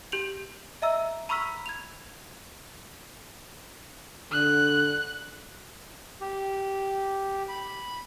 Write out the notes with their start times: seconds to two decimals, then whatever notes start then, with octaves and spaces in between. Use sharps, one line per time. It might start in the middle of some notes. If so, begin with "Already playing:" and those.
0.12 G4 G6 F7 F#7
0.82 D#5 E5 A#5 E6
1.29 A#5 B5 C#6 E6 F6 B6
1.66 G#6 F7
4.32 D3 F#6
6.21 G4
7.48 B5